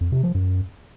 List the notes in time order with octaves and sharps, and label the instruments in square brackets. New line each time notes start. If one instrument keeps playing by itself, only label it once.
[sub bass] F2
C3
F3
F#2